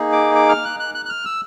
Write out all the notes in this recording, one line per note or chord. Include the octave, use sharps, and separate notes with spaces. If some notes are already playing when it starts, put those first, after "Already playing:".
Already playing: A#3 D#4 G#4
D6
D6
F6
F#6
F#6
F#6
F#6
F6
E6